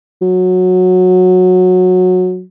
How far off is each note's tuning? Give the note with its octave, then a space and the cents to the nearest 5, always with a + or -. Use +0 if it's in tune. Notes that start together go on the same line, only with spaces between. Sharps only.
F#3 -15